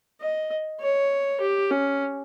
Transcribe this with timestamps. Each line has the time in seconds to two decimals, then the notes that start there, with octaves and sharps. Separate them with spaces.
0.21 D#5
0.81 C#5
1.41 G4
1.71 C#4